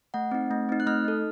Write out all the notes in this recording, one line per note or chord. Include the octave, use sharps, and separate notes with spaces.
A3 F#5
C4 D#4
A3
C4 D#4
F#6
A3 F6
D#4 A4